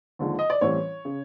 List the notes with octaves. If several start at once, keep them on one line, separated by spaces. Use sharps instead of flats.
D#2 D3 F3 G#3
D#5
D5
A1 A2 E3 G3 C4 C#5
C#3